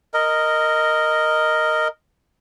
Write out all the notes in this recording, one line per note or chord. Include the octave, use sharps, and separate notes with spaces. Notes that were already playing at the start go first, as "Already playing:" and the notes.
A#4 D#5